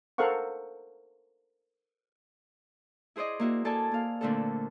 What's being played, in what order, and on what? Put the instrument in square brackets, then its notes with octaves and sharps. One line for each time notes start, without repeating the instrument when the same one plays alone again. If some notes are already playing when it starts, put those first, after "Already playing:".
[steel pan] A4 A#4 C5 F5 F#5 C#6
[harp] E4 G#4 C5 D5 D#5
A#3 E4 F#4
A#3 A4 D5 G#5 A5
A#3 F5
A#2 D3 A3 C4 D4 A4